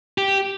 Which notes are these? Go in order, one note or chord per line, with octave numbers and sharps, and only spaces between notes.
G4